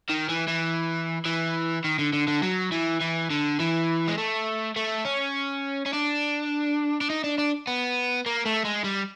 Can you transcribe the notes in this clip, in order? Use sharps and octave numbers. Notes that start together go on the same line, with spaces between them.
D#3
E3
E3
E3
D#3
D3
D3
D3
F#3
E3
E3
D3
E3
G#3
A3
A3
C#4
C#4
D4
D4
D#4
D4
D4
B3
A#3
A3
G#3
G3